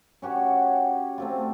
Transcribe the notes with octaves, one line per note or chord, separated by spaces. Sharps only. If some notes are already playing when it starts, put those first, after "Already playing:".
C#4 F#4 G4 C#5
A3 C4 F4